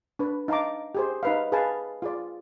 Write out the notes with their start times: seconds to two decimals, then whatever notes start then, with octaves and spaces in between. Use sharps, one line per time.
0.19 D4 B4
0.48 D#4 F5 A5 A#5 D6
0.95 G4 G#4 C5
1.23 D#4 B4 F5
1.52 G#4 B4 F5 G#5 A5
2.02 F4 G#4 D5